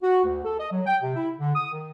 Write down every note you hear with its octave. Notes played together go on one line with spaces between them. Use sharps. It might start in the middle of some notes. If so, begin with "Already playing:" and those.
F#4
D2
A4
D#5
F#3
G5
C3
E4
D3
D#6
D#3